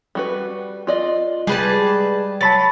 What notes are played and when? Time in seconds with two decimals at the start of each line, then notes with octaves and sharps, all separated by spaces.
0.15 G3 F#4 B4
0.87 F4 D5 D#5
1.47 G3 G#3 G#4 B4 A5
2.41 F#3 A5 B5 A6